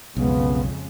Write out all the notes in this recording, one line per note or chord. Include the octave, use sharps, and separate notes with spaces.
B1 F2 C#3 G#3 B3